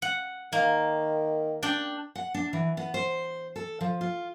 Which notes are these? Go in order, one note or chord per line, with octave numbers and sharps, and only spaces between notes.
F#5
D#3 A#3
D4 G5
F#5
D4
E3
B3
C5
A4
F3
F4